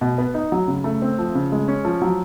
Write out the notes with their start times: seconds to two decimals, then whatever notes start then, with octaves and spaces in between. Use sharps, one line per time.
0.01 B2
0.18 B3
0.34 D#4
0.52 F#3
0.68 C#3
0.84 A3
1.02 C4
1.19 F3
1.35 C#3
1.52 G#3
1.68 C#4
1.85 F3
2.02 F#3